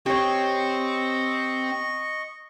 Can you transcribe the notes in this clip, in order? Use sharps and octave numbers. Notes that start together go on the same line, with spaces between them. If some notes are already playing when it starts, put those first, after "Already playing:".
C4 G4 C#5 D#5 C#6